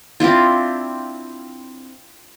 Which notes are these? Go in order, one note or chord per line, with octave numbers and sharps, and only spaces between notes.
C4 D4 E4 F4